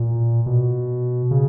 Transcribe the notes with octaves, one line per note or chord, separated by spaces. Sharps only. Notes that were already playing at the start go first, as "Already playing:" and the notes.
Already playing: A#2
B2
C#3